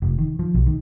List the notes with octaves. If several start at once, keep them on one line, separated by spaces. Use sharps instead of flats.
F1
D#3
F3
B1
D#3